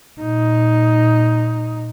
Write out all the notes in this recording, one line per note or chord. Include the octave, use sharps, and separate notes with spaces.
A#2 D#4